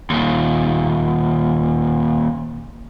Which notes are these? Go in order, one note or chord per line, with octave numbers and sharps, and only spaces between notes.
D#2 A#2